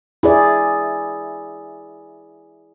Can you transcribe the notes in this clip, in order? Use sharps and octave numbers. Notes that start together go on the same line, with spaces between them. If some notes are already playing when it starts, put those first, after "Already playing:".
E4 G#4 D5